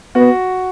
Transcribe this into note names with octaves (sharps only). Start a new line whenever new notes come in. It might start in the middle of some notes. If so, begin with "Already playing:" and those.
B3 F#4